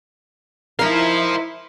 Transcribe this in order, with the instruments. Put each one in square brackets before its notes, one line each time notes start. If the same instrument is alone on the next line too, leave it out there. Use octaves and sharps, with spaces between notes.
[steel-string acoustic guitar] D#4 A#4 [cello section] E4 [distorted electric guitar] C5 F5